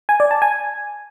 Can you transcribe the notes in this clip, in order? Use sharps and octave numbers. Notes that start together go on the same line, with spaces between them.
G#5
D5
A5
G#5